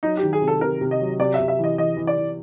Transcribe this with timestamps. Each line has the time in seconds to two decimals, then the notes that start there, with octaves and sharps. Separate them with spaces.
0.03 F#3 D#4
0.17 G4
0.23 D#3
0.33 G#4
0.42 C3
0.48 A4
0.61 C3 A#4
0.81 C3
0.91 D#5
1.01 F#3
1.19 C3 D5
1.34 E5
1.40 C3
1.48 E5
1.59 E3 D#5
1.78 E3 D#5
1.97 E3
2.07 D5
2.17 E3